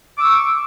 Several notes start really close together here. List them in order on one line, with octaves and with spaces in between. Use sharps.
D6 E6 C#6